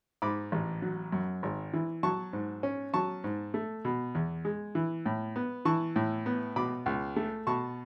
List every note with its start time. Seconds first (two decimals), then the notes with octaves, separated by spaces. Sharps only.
0.22 G#2 B5 D6
0.52 A1
0.82 F#3
1.12 F#2
1.43 G#1
1.73 E3
2.03 F#3 A5 C#6
2.33 G#2
2.63 C#4
2.94 F#3 A5 C#6
3.24 G#2
3.54 A3
3.85 B2
4.15 E2
4.45 G#3
4.75 E3
5.06 A2
5.36 B3
5.65 E3 A5 C#6
5.96 A2
6.26 B3
6.56 B2 B5 D6
6.86 C#2
7.16 A3
7.47 B2 A5 C#6